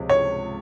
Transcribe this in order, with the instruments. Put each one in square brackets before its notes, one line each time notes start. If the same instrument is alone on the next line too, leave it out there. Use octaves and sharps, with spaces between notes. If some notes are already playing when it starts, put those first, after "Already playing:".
Already playing: [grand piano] C#2 C3 F3 G#3
[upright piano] C#5